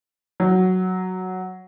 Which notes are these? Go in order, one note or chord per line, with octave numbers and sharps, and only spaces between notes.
F#3